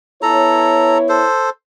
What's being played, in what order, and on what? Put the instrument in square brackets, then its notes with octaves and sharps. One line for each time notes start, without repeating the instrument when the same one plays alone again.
[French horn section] B3 E4 C#5 [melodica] A4 A#5
[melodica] A4 C5